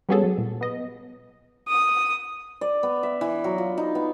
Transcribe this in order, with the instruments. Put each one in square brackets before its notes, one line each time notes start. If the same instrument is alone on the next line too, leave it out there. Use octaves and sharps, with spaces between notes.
[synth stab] G3 B3 C#4 F#4 G#4 A4
F#3
A#2
B3 D#5
[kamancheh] D#6
[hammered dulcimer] D5
B3
E5
E3
F#3
F4
D#4
B3